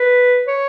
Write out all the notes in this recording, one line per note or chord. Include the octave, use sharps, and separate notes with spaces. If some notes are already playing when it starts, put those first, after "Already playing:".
Already playing: B4
C#5